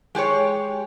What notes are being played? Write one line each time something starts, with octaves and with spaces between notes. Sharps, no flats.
G#3 G4 G#4 C#5